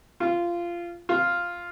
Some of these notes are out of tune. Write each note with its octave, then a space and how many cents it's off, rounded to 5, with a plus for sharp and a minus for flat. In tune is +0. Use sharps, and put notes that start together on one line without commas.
F4 -15
F4 +0